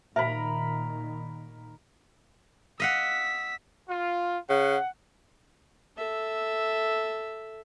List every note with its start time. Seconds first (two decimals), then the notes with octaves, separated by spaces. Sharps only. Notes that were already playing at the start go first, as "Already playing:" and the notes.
0.16 A#2 D#3 A#4 E5 A#5 B5
2.80 D#5 F5 F#5 E6 B6
3.88 F4
4.50 C#3 F#5
5.97 A4 E5